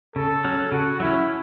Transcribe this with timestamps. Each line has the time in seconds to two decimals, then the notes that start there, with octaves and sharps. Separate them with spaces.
0.16 C#3 A4
0.44 F#3 C#4
0.72 C#3 F#4
1.00 F#3 C#4 E4